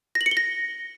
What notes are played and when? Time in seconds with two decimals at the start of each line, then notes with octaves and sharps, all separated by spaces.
0.15 A#6
0.21 F#7
0.26 C#7
0.31 G7
0.37 A#6